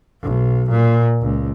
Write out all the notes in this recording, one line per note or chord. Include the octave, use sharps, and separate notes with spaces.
B1
A#2
C#2